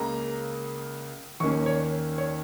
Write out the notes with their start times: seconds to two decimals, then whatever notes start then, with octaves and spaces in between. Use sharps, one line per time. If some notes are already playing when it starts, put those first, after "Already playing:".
Already playing: C#2 C#3 A#3 A#5
1.40 D#2 D#3 A#3 C#4 C#6
1.66 C#5
2.18 C#5